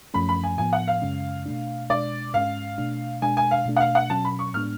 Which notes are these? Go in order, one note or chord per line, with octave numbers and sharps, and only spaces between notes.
F#2 F3 A3 C#4 B5
B5
G#5
A2 F3 B3 G#5
F#5
F5
F#2 C#3 G#3 C#4
B2 A3 D4
B2 G#3 D4 D5
G#2 G#3 C#4 F5
B2 A3 D4
B2 G#3 D4 G#5
G#5
F5
B2 A3 D4
F#5
F5
F#5
B2 F#3 C#4 A5
B5
C#6
A2 G#3 B3 D4 F6